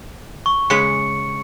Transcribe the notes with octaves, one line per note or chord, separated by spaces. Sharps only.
C#6
C#3 G#3 B4 C#7